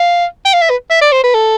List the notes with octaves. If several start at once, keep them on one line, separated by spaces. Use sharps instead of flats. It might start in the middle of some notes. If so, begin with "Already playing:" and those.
Already playing: F5
G5
F5
E5
B4
E5
D5
C5
B4
A4